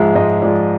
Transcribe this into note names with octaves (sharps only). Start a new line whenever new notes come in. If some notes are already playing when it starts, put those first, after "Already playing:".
Already playing: G#2 F3 G#3 E5
G#2 D#5
F3 G#3 D5